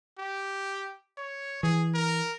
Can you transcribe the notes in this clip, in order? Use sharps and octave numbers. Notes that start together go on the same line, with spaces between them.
G4
C#5
E3 G#4
A#4